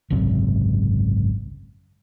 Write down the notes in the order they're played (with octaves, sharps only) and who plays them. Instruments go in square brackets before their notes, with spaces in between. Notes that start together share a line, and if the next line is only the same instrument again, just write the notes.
[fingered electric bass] G#1 C#2 F#2 C3